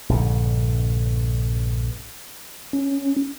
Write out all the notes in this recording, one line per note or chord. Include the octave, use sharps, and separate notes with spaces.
A#1 G2 D3
C#4